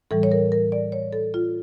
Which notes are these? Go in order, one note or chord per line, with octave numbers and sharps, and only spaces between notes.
A2 E3 G3 A4
C#5
A#4
A#4
D5
C#5
A4
F4